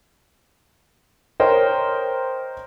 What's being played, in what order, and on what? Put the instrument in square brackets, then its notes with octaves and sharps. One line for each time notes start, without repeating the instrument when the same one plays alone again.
[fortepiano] A#4 C5 C#5 D#5 G5